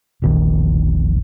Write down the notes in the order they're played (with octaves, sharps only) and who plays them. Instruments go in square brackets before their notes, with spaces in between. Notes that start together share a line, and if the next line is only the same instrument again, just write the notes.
[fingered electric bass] E1 A#1 D#3